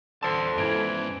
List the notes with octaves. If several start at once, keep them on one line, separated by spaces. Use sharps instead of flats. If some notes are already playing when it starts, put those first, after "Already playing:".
D3 A4 C5 A5 C6 E6 A6
G#2 C#3 E3 E4 G#6 D7